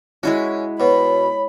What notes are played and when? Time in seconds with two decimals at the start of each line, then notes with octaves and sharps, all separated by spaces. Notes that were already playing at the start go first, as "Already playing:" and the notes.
0.23 G#3 C#4 E4 F#4
0.80 B2 C#5 B5